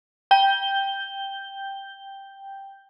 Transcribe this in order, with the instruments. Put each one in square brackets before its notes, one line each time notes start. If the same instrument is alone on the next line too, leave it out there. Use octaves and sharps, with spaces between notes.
[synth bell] G5 G6 G7